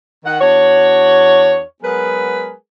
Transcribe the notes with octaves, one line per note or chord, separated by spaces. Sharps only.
D#3 F#5
E2 D4 F#4 C#5
F#3 G#3 B3 G#4 A#4 B4